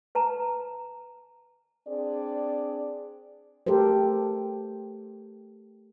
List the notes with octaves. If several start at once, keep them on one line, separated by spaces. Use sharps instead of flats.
B4 A5 A#5
C4 D4 G#4 D5
A3 G4 A4 A#4 C5